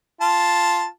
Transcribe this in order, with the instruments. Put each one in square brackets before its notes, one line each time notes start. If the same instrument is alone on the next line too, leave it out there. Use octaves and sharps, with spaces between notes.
[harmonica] F4 A5